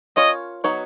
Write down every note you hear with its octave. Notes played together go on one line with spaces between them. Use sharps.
C#4 F4 A#4 C#5 D#5
F#3 B3 D#4 F#4 C#5